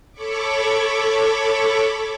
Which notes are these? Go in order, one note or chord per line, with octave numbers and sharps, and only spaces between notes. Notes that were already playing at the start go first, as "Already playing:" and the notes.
A4 C#5 B5 C#6 D6